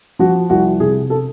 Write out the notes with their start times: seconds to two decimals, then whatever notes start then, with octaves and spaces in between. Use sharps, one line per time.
0.19 F3 F#4
0.50 C2 F#4
0.80 C3 G#4
1.10 A4